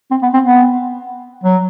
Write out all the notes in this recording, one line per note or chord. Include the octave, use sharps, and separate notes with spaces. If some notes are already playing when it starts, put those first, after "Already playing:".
C4
B3
C4
B3
F#3